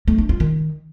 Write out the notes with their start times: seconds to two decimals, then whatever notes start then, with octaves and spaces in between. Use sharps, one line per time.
0.08 A3
0.18 D4
0.29 F4
0.40 D#3